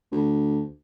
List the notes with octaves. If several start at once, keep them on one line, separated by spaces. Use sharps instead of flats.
D2